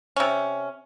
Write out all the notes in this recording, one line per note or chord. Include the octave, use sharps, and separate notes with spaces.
C3 C#4